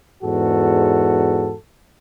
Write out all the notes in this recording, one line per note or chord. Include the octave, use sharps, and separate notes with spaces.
E2 G#2 F#4 A4